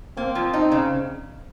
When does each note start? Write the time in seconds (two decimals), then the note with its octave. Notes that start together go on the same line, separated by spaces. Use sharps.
0.17 A#3 C4
0.35 F3
0.54 D#4
0.72 C#3